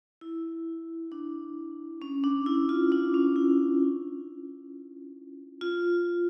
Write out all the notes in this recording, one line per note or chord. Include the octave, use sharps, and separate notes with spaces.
E4
D4
C#4
D4
E4
F4
D4
C#4
E4
F4